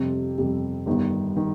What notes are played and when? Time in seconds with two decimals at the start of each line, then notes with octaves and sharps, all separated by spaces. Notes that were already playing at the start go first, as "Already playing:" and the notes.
Already playing: F2 C3 G3
0.38 F2 C3 G3
0.86 G1 G2 D#3
1.36 D#3